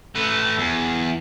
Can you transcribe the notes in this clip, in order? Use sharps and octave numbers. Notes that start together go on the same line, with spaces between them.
A3 B4
E2